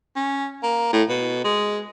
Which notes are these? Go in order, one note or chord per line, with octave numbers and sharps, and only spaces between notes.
C#4
A#3
A2
B2
G#3